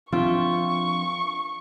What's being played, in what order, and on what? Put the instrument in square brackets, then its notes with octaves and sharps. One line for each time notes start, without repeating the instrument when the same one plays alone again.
[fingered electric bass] F3 C4 D4 [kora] F4 E5 G5 [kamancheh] C#6